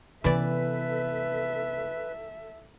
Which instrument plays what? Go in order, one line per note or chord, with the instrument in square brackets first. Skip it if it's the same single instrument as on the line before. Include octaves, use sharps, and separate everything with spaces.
[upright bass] C3 B3 [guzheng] E3 D5 [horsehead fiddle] A4 E5 [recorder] B4